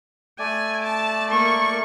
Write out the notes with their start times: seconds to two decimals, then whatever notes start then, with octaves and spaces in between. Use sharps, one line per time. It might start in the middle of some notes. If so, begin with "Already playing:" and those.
0.39 A3 D5 G#5
0.84 A5
1.30 A#3 C#6